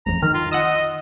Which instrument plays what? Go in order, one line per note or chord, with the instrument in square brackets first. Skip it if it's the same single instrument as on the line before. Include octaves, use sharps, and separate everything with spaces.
[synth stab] A1 F2 [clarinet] A#5
[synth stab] D#3 [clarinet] F6
[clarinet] F4
[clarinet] D#5 [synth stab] F#5 D#6 E6